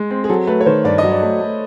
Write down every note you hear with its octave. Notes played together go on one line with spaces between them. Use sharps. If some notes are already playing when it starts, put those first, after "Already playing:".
Already playing: G#3
C4
G#4
F#3 A4
A3 B4
C#5
D#3 C5
G2 D5
F#3 D#5
D5
A3
A3